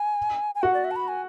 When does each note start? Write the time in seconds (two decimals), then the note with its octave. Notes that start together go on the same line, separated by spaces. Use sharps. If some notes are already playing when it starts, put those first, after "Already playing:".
Already playing: G#5
0.55 G#5
0.62 F#4 F#5
0.74 D5
0.84 E5
0.91 A5
0.96 B5
1.08 G#5